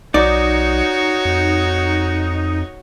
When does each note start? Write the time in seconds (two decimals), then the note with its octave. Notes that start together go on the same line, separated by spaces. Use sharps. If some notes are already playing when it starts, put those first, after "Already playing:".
0.14 B1 D#4 F#4 C#5 D5
1.25 F2